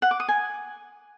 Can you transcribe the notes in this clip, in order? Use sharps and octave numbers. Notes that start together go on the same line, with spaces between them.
F#5
D6
D#6
G#5